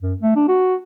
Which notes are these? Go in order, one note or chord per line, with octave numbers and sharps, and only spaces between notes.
F#2
A3
D4
F#4